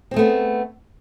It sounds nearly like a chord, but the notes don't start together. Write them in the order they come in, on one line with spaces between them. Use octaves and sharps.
C4 G#4 A3 B3